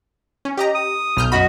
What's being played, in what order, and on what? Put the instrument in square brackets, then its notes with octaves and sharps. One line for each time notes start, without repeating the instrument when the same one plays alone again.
[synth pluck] C#4
G4 D#5 A#5
[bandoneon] D#6
[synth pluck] B1 F6 G6
[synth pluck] F#2 D#5 B5 [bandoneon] F#4